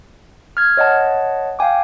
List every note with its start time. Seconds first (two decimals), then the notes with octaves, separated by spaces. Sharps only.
0.57 F6 G#6
0.77 C#5 D#5 F#5 A5
1.59 F5 G5 G#5 D6